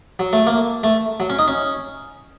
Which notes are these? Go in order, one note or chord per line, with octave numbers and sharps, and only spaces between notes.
F#3
A3
A#3
A3
F#3
C#4
D#4
C#4